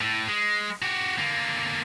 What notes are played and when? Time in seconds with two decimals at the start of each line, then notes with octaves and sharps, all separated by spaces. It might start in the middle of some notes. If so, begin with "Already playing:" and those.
0.01 A2
0.28 G#3
0.82 F#4 G4
1.18 D3 A#3